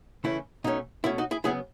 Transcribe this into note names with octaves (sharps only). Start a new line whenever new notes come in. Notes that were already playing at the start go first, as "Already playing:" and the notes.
C#3 E3 A3 C#4 E4
B2 A3 C#4 D#4
B2 A3 C#4 E4
D#4 F#4
E4 G#4
C#3 F#3 B3 E4 G#4